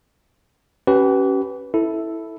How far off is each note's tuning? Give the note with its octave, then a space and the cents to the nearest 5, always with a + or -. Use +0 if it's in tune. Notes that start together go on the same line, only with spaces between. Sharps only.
C#4 +0 G4 -40 B4 +0
E4 -10 A4 +0